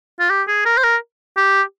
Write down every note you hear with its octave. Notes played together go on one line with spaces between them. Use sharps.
F4
G4
G#4
A#4
C5
A#4
G4